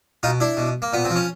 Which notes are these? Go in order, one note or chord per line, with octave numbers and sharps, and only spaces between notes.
B2 D#4 F4
D4 E4
B2
A#3
A#2 B3
C4
F3
C#4